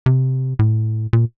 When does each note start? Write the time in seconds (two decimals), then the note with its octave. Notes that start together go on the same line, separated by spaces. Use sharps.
0.06 C3
0.59 A2
1.13 A#2